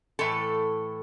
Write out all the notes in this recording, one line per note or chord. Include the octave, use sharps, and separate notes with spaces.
A2 E3 A3 A4